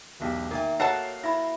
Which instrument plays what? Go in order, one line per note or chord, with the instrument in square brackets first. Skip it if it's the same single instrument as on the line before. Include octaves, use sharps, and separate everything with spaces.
[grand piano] E1 B1 G4
[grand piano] D#3 [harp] A#3 [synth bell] A#4 E5
[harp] F#4 A#4 F5 [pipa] A4 F#5 A5 [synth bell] C#5 [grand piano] C7
[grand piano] E4 [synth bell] B5 A#6